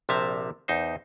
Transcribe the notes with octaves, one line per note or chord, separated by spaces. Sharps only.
A#1 C3 F3 E5 A5 A#5
E2 D#4 C5